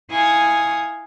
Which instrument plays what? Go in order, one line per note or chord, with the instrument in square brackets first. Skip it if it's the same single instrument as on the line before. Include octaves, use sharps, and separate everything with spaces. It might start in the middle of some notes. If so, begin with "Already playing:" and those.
[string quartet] E4 F5 G#5 C#6 D#6